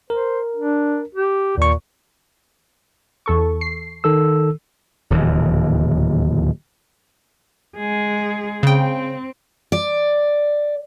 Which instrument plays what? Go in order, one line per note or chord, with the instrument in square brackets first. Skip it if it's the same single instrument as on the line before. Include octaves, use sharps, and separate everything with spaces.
[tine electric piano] A#4 [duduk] C5
[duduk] D4
G4
[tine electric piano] D#2 C#6 [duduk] A#2
[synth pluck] E2 A4 C#6
C7
[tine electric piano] D#3 A4 E6
[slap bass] D1 D#2 A#2 E3
[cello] G#3 G#4
[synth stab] C#3 G5 [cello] C4
[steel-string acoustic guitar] D5